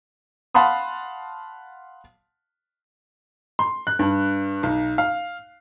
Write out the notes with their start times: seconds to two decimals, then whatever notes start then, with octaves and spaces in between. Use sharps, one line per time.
0.54 F5 F#5 A5 B5 C6 D#6
3.59 C6
3.87 F#6
3.99 G2
4.63 B1
4.98 F5